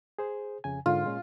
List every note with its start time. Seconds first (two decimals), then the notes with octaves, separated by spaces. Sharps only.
0.19 G#4 C5
0.64 F2 C#3 G#5
0.86 G#2 D3 F4
1.05 A#2 G#3 C#4